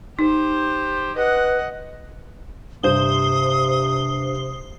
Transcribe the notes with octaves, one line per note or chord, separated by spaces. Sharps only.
D#4 G4 C5
B4 D#5 F#5
G2 C3 C5 D#6 G7